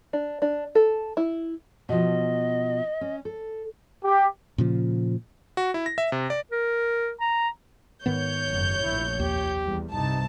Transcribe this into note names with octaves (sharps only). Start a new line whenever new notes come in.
D4
D4
A4
E4
B2 F3 D#5
C#4
A4
G4
A#2 C#3 F3
F#4
E4
A#6
E5
C3
D5
A#4
A#5
G#2 D#3 B3 C#5 G6
F#1 F#2
F1 A#1 E4
D#2 G4
E2 G3
C2 G2 C3 D#4 A5